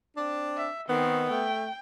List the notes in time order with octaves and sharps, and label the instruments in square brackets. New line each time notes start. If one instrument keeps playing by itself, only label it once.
[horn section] C4 D4
[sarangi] E5
[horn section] D#3 [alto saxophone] B3 [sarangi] C4
[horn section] A3 [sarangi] G5